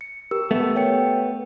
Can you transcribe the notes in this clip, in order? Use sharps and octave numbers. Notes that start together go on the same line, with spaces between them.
C#7
G4 A#4 E6
A3 B3
C#5 G5 C#7